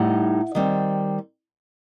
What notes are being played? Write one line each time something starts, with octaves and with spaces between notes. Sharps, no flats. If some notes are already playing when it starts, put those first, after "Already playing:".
Already playing: A2 G3 D#4 F#5
D#3 G3 C4